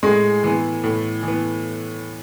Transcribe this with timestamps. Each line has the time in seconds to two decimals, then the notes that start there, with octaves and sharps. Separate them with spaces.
0.03 A2 G#3
0.43 E3 B3
0.84 A2
1.22 E3
1.28 B3